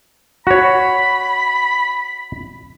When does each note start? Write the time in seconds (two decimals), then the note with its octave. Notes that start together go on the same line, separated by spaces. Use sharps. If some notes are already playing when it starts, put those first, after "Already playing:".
0.47 F#4 C#5 B5